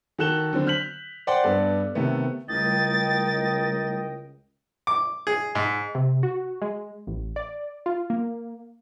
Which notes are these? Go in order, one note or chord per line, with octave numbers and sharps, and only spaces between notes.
D#3 F#4 A4 F#6 E7 G7
D3 F#3 C4
F6 G6 B6 F#7
C5 D5 F#5 G5 C6
G2 B3 A4 D5
C3 D#3 A3 B3
C#2 G3 A3 E4 A#4 D#5 G5 A6
D6
G#4
G#2
C3
F#4
G#3
A1
D5
F4
A#3